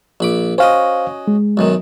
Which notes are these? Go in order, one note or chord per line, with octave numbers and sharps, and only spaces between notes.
A#1 B5 D6
C#4 F#4 C5 D#5 F5
G#3
B1 F#2 D#3